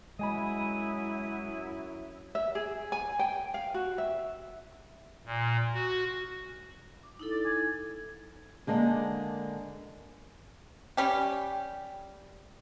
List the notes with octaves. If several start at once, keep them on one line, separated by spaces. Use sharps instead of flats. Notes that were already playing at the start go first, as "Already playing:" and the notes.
F#2 F#3 G#3 E4 D#5 G#5 B5 D#6
E5
G#4
G#5
G5
F5
F#4
E5
A#2
F#4
D6
D#4 E4 A4
D5
G#5
D3 G#3 A#3 D4
G3 C#4 G4